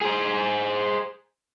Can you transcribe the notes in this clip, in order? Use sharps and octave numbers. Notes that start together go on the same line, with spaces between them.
G#4 C5